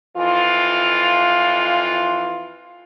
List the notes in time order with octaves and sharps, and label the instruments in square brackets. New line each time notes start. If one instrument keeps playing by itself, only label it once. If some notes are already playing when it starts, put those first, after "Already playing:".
[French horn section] F2 E3 F4